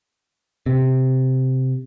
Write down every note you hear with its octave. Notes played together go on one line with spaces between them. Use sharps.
C3